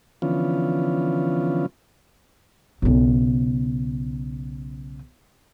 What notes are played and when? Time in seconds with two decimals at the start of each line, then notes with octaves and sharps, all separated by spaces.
0.22 D3 E3 F3 B3 C#4 F4
2.82 B1 C#3